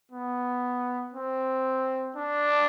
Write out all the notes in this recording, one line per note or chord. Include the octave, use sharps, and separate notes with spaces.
B3
C4
D4